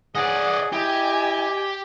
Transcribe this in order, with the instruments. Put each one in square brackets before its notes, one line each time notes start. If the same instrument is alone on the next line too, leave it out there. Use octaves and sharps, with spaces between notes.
[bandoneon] G#4 [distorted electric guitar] D5 D#5 [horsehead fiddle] F#5 G#5
[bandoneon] E4 [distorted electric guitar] G4 [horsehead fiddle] D#5 [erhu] G#5